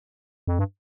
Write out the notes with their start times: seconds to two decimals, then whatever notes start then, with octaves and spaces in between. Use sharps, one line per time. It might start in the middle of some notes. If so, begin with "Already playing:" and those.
0.47 F2
0.59 G2